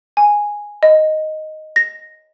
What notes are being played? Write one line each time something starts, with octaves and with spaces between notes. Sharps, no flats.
G#5
D#5
A#6